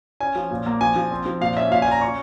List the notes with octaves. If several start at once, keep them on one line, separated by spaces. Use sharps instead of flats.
C#4 G#5
F3
A#2
A#3
F3 G#5
F3
C4
F3
A#2 F5
C#4 E5
A#2 F5
G#5
C#4 A#5
C#4 C#6